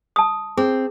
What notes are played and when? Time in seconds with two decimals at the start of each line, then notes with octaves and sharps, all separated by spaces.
0.16 A5 D#6
0.57 C4 G#4